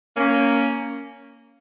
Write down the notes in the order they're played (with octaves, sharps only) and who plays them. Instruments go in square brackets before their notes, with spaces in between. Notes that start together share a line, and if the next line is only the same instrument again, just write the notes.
[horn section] A#3 C#4